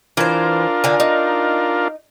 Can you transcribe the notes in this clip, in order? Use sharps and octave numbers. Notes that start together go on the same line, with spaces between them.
E3 D4 F4 A#4 C5
D3 G#5
D#4